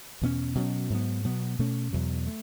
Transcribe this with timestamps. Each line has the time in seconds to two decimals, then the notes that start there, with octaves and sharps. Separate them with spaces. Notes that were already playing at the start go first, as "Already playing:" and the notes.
0.22 E2 B2 A3 C#4
0.55 B2 F#3 C#4
0.90 G#2 F#3 B3
1.24 B2 F#3 B3
1.59 B2 A3 C#4
1.93 E2 B2 F#3
2.27 A3